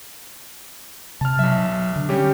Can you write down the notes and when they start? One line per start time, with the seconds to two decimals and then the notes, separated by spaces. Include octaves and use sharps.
1.21 C3 A5 F6
1.39 B1 F#3 E5
1.96 D3
2.09 G3 C#4 G4